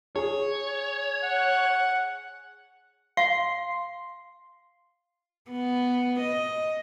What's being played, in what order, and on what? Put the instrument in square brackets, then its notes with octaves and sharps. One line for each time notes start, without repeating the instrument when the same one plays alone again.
[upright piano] G#4 [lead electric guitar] C#5
[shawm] F#5
[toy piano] F5 [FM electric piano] C6
[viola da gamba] B3
D#5